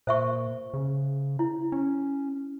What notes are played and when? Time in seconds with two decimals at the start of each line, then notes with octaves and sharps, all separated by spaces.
0.07 A#2 C5 E5 C#6
0.74 C#3
1.39 E4
1.72 C#4